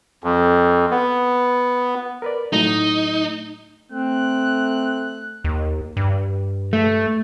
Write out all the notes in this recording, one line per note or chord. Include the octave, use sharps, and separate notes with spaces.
F2
B3
A#4 B4 D5
A2 F#3 A3 D#4
A3 C4 F#6
D#2
G2
A3